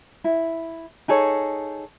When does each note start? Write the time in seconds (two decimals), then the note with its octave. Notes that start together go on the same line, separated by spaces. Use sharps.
0.24 E4
1.08 D#4 G#4 A4 C#5